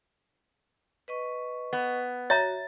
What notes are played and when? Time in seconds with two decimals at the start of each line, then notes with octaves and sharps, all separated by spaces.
1.08 B4 D#5 C#6
1.73 B3
2.30 F#4 C#5 E5 A#5 A6